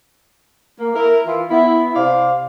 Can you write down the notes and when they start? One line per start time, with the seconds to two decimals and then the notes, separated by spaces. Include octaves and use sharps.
0.80 A#3
0.96 E4 A#4
1.26 E3 E4 F4
1.51 B3 E4
1.96 C3 C5 D5 F5